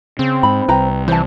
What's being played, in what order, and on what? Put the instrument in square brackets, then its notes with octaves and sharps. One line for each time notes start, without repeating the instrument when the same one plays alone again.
[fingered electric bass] C#3 [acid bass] C4
[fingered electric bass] G#2 [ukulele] B5
[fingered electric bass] C2 [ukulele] B4 G5 A#5
[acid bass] E3 [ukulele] C5 A5